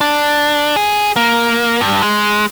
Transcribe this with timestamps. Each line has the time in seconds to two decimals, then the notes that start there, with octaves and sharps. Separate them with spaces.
0.01 D4
0.76 G#4
1.16 A#3
1.81 G2
2.02 G#3